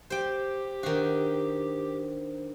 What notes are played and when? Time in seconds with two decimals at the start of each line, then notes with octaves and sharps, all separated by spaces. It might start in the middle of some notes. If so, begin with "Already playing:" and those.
0.10 G4 C5 G5
0.83 D#3 D4 D#4 F#4 C5